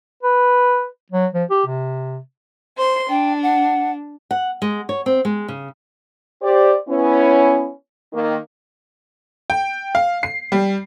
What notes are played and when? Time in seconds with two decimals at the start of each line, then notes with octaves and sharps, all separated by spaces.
0.23 B4
1.12 F#3
1.34 F3
1.50 G4
1.66 C3
2.76 C5 C6
3.09 D4 G5
3.43 F#5
4.31 F#5
4.62 G#3
4.89 C#5
5.06 C4
5.25 G#3
5.48 C#3
6.42 G4 C5 D5
6.88 B3 C#4 E4
8.14 D#3 A#3
9.50 G5
9.95 F5
10.23 C7
10.52 G3